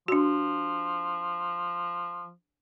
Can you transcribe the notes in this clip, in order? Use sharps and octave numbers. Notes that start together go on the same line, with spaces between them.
F3 D4 F#4